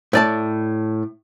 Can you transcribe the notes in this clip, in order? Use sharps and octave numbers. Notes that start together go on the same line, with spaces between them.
A2 D5 A5